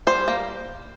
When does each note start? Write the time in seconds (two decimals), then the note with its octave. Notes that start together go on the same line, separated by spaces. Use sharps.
0.07 G3 C5
0.28 A#3